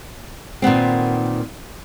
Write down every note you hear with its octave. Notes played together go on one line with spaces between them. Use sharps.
A#2 D#3 B3 C4